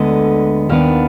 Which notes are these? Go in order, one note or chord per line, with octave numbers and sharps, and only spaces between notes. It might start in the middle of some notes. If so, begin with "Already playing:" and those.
Already playing: D2 D3 G#3 B3 D#5
D#2 D#3 B3 D4 F5